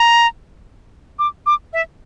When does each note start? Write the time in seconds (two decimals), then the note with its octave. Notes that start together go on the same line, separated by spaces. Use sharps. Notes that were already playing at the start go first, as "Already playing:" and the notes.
Already playing: A#5
1.19 D6
1.46 D6
1.73 E5